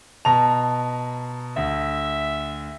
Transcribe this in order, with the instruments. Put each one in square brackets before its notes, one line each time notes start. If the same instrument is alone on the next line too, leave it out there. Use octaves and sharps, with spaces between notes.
[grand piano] B2 A#5 F7 [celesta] A5
[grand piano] D2 [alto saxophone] E5